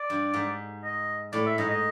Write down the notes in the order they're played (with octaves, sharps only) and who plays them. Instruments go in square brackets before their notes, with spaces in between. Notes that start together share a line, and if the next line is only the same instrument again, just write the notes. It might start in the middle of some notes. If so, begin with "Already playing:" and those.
Already playing: [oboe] D5
[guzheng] G2
G#2
[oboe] D#5
[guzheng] A2 [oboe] D5
[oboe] E5
[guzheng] G#2 [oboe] D#5
[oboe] D#5